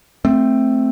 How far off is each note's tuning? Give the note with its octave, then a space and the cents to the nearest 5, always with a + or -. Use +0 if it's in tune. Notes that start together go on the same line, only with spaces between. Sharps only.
A3 +0 C4 +0